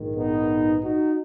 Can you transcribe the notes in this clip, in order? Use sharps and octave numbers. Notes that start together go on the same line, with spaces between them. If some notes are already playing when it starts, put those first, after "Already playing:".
Already playing: A#1 G#2 D#3
B3 D#4
D#4 F#4